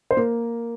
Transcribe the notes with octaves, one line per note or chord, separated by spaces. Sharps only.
C5
A#3 A#4